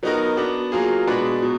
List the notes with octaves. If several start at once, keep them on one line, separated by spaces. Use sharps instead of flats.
F#3 B3 D#4 F#4 A#4
B3 D4 F#4
F#3 A#3 F4 G#4
B2 G#3 D4 F#4 B4
B2 F#3